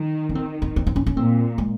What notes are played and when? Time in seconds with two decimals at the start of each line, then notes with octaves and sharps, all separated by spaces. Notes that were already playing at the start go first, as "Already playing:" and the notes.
Already playing: D#3
0.29 C#4
0.35 D#3 C4
0.62 C4
0.76 C4
0.87 C4
0.96 C#4
1.07 C#4
1.16 A#2 C4
1.58 G#3